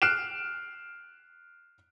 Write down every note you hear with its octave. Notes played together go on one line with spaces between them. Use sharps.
F6 F#6 C7 D7 E7